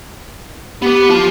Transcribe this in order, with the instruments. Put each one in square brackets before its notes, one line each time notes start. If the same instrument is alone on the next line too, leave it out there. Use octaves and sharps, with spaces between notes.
[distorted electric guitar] B3 B4 [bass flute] G4
[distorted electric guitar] F4 A5